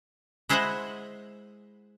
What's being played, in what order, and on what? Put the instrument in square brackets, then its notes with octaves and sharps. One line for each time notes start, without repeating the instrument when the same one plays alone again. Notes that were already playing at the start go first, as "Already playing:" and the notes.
[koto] G#3 E4 C5 D#5 E5 F#5